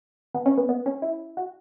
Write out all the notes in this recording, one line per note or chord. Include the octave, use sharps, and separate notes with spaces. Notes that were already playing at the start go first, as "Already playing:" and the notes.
B3
C#4
B3
B3
C#4
E4
F#4